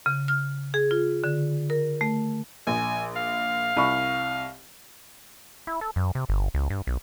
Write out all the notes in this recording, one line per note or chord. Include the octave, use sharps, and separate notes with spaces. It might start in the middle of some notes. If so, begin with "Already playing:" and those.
C#3
F6
G#4
F4
D3
A#4
A3
A#1 G#5
F5
C2 B5 C#6
E4
A4
F#2
C3
G1
C#2
G2
B1